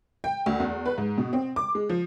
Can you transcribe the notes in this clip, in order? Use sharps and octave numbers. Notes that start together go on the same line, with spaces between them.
G5
D2
E2
B4
G#2
B2
C4
D6
G#3
F3